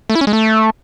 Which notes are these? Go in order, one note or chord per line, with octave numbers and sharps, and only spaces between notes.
A3
E4
C#4
G#3
A3